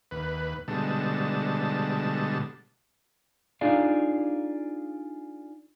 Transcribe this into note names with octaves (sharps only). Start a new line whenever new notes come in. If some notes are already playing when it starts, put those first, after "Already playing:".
D#2 B4
B2 D3 G3 G#3 A5
D4 D#4 F4 G#4 D5 F5